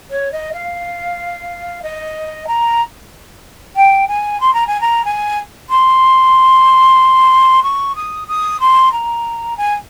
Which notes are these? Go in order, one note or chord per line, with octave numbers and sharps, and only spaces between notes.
C#5
D#5
F5
D#5
A#5
G5
G#5
C6
A#5
G#5
A#5
G#5
C6
C#6
D#6
D#6
C6
A#5
G#5